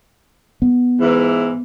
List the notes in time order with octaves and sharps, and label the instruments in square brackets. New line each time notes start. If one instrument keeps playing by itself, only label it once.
[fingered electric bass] B3
[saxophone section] G#2 E3